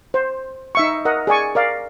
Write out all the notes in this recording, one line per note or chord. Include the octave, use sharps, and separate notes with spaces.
C5
D#4 E5 C#6
A#4 D#5 F#5
G#4 D5 G#5 C#6
A#4 D5 F5